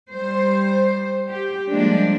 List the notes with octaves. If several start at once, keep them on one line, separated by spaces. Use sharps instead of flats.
G3 C5
G4
F3 G3 G#3 A#3 D4